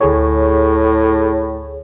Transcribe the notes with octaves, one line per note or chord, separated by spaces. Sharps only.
D2 A2 G#4 C#5